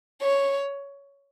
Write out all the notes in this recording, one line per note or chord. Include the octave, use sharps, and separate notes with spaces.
C#5